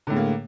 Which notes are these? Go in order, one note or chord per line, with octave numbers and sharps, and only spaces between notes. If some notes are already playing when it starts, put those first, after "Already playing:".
A2 D3 G#3 A#3